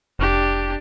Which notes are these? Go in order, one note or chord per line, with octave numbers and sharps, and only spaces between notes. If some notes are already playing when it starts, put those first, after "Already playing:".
F1 D4 G4